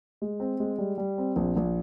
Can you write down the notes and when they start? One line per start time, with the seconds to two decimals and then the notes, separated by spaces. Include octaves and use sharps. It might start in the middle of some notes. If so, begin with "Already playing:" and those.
0.22 G#3
0.40 C4
0.60 G#3
0.78 G3
0.98 G3
1.18 C4
1.36 A#1
1.56 A#1